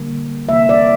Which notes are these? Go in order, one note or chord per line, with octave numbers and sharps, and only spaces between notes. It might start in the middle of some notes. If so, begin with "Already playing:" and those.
Already playing: D3 G3 A#3
C3 E3 A#3 E5
D5